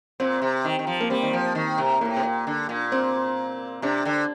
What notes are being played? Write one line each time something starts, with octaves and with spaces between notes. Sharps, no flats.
A#2 C4
C3
D#3
D#3
F3
A#3
G3 C4
D#3
F3
D#3
C3
A2 A#3
C3
A#2
D3
A#2
C4
C3 D4
D3